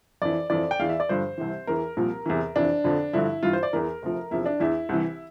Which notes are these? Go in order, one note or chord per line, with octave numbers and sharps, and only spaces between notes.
F2 E3 D5
F2 E3 D5
G5
E2 E3 F5
E5
D5
G2 D3 F3 C5
C2 C3 E3
E2 E3 A#4
C2 A#2 F3
E2 C3 E3
F2 C3 E3 D4
F2 D3 F3
G2 D3 F3 E4
G2 E3 F4
C5
D5
E2 E3 A#4
D2 C3 F3
E2 C3 F3 E4
D4
E2 E3 E4
C2 C3 E3